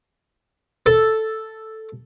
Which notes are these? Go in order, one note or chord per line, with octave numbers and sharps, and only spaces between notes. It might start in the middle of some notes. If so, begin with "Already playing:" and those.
A4